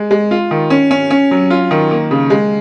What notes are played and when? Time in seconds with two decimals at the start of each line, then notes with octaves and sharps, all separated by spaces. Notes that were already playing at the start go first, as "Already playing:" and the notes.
Already playing: G#3
0.11 G#3
0.31 F4
0.51 D#3
0.70 C#4
0.91 C#4
1.11 C#4
1.31 F#3
1.50 F4
1.71 D#3
1.91 A#3
2.11 C#3
2.30 G#3